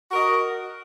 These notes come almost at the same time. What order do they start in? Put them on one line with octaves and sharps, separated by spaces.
F#4 A#4 D#5